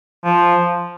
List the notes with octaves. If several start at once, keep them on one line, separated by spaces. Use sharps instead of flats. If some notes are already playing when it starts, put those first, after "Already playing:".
F3